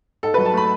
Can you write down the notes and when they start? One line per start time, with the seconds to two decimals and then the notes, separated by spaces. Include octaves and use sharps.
0.23 G#2 A4
0.34 F#3 B4
0.46 A5
0.54 A3 B5